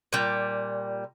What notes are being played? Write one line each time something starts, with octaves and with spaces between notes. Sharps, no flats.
A#2 G3